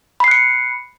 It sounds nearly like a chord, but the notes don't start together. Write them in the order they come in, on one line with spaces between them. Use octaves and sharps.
B5 C7 F#6 C#7